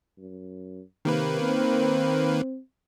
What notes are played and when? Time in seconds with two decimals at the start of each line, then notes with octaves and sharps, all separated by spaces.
0.18 F#2
1.05 C3 D#3 A#3 B4
1.42 C4